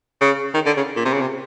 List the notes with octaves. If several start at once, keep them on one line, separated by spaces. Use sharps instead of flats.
C#3
D#3
D3
C#3
A#2
C3
C#3
C3